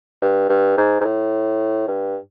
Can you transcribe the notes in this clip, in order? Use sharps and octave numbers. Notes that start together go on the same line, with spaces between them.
G2
G2
G#2
G#2
A2
G2